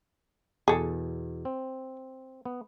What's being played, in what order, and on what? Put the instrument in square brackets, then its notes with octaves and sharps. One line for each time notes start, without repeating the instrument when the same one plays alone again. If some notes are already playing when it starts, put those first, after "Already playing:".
[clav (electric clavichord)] E2 B2 [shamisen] G#4 A4
[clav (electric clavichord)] C4
B3